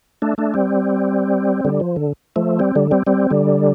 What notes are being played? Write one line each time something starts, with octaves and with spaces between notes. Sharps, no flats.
A3 D4
A3 D4
G3 C4
D3 G3
F3
D3
F3 A3
G3 C4
D3 G3
G3 C4
G3 C4
D3 G3